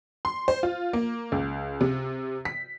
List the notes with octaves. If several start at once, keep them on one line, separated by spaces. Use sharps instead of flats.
C6
C5
F4
A#3
C#2
C3
B6